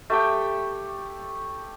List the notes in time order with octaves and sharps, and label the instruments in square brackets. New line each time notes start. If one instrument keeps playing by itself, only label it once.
[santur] A3 G4 G5